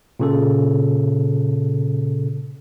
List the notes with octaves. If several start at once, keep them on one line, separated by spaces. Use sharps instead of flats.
A#2 C#3 A4